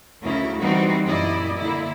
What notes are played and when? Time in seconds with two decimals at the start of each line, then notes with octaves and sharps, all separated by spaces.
0.22 D2 C#3 E4 A#4
0.59 E3 G3 C4 D#4 F#4
1.05 F#2 A#2 E4 D5 D#5
1.58 D3 A#3 E4